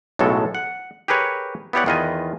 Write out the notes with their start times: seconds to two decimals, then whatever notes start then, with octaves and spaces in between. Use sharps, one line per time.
0.19 B1 A2 C#3 F#3 G#3 A4
0.55 F#5
1.08 G4 G#4 A#4 B4 C#5
1.73 B3 E4 G4 C#5 D5 F#5
1.86 E2 D#3 F4 B4 D#5 G#5